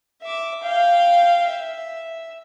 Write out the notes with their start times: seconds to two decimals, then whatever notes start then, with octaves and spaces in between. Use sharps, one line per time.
0.23 E5 D6
0.63 F5 G5
1.48 E5